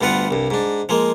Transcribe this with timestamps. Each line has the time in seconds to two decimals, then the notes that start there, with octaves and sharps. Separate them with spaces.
0.01 D2 G2 B3 F4 F#5
0.31 C2 G2
0.51 G#2 D4
0.89 F3 G#3 A#3